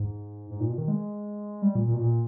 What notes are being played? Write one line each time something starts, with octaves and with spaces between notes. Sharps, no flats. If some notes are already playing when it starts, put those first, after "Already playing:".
Already playing: G#2
G#2
A#2
B2
D#3
G#3
G3
A#2
A#2
B2
A#2